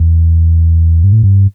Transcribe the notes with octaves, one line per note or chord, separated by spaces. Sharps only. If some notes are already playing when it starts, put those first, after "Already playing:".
Already playing: E2
G2
A2
G2